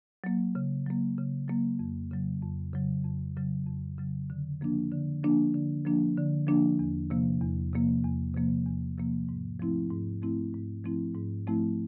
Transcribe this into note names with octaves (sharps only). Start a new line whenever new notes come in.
F#3 A#3
C#3
F#3 A#3
C#3
F#3 A#3
F2
C#3 F#3
F2
C#3 F#3
F2
C#3 F#3
F2
C#3 F#3
D3
F3 A#3 D4
D3
F3 A#3 D4
D3
F3 A#3 D4
D3
F3 A#3 D4
E2
C3 F3 A#3
E2
C3 F3 A#3
E2
C3 F3 A#3
E2
C3 F3 A#3
G#2
F3 A3 C4 E4
G#2
F3 A3 C4 E4
G#2
F3 A3 C4 E4
G#2
F3 A3 C4 E4